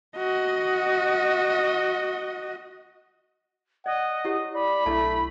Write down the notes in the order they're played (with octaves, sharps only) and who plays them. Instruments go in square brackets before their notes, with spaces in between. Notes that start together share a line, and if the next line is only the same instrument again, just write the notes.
[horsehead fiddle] F#4 D#5
[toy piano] D5 [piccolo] D#5 [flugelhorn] F#5
[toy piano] E4 G4 C#5
[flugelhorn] D5 [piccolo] B5
[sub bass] B1 [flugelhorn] A3 [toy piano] D4 E4 A5